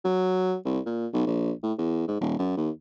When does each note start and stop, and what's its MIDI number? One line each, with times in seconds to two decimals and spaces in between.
0.05 0.56 54
0.65 0.80 36
0.86 1.07 46
1.13 1.23 35
1.26 1.52 34
1.63 1.73 45
1.79 2.07 40
2.08 2.20 44
2.21 2.39 27
2.39 2.53 42
2.57 2.70 39